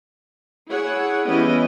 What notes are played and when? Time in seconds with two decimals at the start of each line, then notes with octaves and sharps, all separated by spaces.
0.70 E4 G#4 C#5 F#5
1.28 E3 G3 B3 C#4 E4 D#5